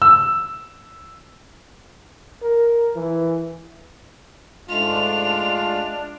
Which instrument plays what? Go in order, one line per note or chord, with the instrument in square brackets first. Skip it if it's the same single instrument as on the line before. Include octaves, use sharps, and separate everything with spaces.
[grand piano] E6
[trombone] A#4
E3
[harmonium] G#2 G#3 A3 [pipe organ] D4 [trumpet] F4 [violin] F7